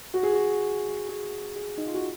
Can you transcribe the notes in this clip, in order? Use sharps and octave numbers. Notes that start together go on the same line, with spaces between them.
F#4
G#4
F#4
G#4
G#4
D#4
F4
F#4